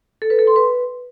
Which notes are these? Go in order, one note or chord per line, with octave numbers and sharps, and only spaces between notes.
A4
B4
A4
C6
B4